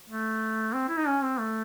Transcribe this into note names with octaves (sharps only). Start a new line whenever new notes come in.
A3
C4
E4
D#4
C#4
C4
A3